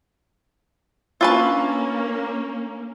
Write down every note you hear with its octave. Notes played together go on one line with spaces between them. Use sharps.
A#3 C#4 D4 F4 B4 A5 C#6 E6